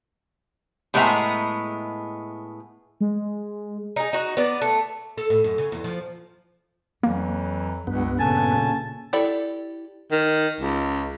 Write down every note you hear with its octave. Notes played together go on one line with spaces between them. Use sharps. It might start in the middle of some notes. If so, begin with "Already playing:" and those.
A2 G#3 B3 G#4 E5 A#5
G#3
D#4 G#4
D#4 F#4
B3 D5
A3
A4
A2
F#2
C#3
E2
F3
F2 E3 F#3 A#3
C#2 G2 B3
A#2 C#3 C#4 A4 G#5 A5
E4 G4 A4 D5
D#3
C#2